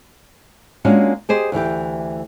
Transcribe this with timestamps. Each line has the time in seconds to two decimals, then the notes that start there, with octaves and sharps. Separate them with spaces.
0.85 G#3 A#3 C#4 D4 F4 F#4
1.29 G4 G#4 C5 D#5
1.52 D2 E3 G4